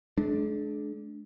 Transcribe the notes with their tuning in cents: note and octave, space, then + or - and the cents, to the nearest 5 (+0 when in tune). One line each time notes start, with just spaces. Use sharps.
G#3 +45 D4 +0